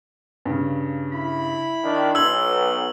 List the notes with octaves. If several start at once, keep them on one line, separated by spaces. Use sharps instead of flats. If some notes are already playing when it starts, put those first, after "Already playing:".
G2 C#3
E4 B5
D#3 D4
B1 C6 E6 G#6 F#7